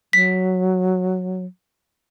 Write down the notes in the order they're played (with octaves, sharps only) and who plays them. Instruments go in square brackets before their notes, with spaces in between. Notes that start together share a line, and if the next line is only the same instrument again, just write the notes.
[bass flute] F#3 [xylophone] B6